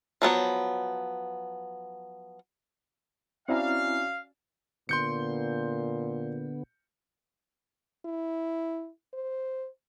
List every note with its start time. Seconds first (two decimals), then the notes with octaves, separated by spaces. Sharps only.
0.22 F3 F#3 B3 C#5
3.49 C4 C#4 E4 F#4 D5 F5 A#5
4.89 A#2 D3 B3 C6 G6 C#7
8.06 E4
9.14 C5